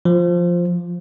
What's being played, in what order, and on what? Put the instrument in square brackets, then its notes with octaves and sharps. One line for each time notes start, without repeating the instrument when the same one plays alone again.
[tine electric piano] F3